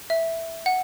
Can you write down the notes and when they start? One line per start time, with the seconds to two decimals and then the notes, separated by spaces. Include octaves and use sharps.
0.10 E5
0.66 F#5